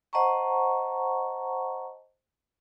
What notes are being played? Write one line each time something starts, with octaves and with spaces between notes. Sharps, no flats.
C5 D#5 F#5 A5 A#5 C#6